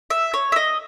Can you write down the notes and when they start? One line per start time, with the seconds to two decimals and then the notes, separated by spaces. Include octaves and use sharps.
0.10 E5
0.34 C#5
0.52 E5
0.56 D#5